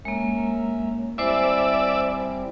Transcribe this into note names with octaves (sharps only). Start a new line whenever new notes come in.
G#3 A#3 C#4 A#4 E5
G3 C4 E4 C5 D5 E5 G#5